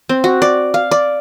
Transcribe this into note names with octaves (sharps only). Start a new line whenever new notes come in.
C4
F#4
D5
F5
D5